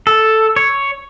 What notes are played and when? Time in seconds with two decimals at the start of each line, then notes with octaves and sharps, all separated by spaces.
0.07 A4
0.56 C#5